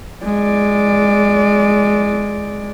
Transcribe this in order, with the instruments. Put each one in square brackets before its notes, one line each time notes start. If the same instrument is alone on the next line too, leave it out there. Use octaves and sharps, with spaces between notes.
[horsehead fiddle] G#3 D5